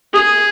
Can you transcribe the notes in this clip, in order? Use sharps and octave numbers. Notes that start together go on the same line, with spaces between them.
G#4